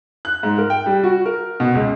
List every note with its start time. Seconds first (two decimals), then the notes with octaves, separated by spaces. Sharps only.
0.25 F#6
0.43 G#2
0.58 A#4
0.70 G5
0.86 G3
1.04 F#4
1.26 A#4
1.60 B2
1.75 C#2